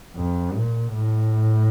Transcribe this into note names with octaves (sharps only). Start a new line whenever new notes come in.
F2
A#2
A2